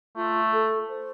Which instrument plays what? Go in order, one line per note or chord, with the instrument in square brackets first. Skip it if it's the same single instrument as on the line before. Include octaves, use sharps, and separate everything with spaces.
[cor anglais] A3 [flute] F4
[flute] A4
C5